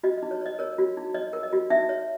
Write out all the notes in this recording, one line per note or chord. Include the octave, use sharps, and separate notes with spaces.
F#4 D#5
D#5
D#4
C#5
C#5 D#5
A#4 C#5
F#4
D#4
C#5 D#5
A#4
D#5
F#4
D#4 E5
C#5